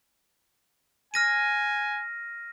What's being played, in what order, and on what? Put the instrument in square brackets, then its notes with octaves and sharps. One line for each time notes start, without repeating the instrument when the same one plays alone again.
[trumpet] G#5 [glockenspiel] F6 A#6 D#7